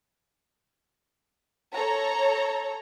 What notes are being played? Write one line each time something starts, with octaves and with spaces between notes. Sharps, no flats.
A4 C#5 A#5